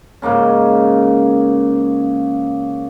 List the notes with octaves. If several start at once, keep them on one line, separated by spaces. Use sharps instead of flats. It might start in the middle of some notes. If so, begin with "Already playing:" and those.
G#2 C#3 A#3 C#4